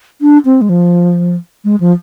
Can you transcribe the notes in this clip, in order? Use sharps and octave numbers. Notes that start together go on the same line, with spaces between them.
D4
C4
G#3
F3
G#3
F3